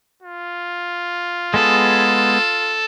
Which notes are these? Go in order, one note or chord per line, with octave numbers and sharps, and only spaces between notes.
F4
G#3 B3 G#4 A4